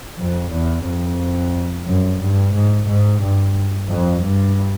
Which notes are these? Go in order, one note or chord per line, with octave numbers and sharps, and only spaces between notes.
F2
E2
F2
F#2
G2
G#2
G#2
G2
F2
G2